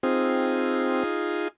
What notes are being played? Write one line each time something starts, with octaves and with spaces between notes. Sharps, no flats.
C4 D#4 F4 G#4